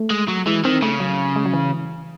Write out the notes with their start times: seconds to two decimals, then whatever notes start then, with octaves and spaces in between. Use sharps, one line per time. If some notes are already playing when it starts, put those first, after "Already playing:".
Already playing: A3
0.11 G#3
0.28 F#3
0.46 E3 G#3
0.64 D#3 C4
0.82 C#3 A3
1.00 F#3
1.36 G#3
1.46 F#3
1.53 E3